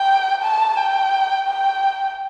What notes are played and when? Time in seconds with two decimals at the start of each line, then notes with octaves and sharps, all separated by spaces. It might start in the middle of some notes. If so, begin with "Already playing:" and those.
Already playing: G5
0.43 A5
0.76 G5
1.47 G5